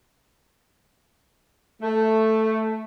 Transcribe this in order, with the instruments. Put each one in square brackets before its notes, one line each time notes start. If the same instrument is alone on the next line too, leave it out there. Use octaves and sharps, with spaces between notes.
[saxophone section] A3